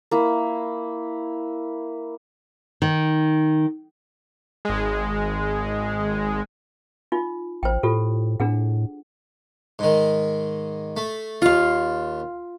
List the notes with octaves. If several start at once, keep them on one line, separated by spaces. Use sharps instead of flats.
A#3 E4
D#3
G#1 G#3
D#4 F4
A1 C5 G5
A2 F4 G4 A4
A2 D4 G#4 F#5
G#2 D#3
A3
D#2 F4 F5 C#6